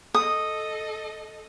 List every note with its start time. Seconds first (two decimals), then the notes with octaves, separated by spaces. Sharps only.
0.14 A4 D#5 D#6